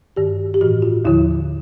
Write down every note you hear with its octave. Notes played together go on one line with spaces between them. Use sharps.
G2 D#3 G4
G4
A2 E3 F#4
F4
D#2 D3 F3 E4